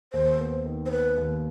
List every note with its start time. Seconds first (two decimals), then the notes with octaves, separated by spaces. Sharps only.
0.13 D#2 C5
0.39 B3
0.65 D#3
0.86 C5
0.91 B3 B4
1.17 D#2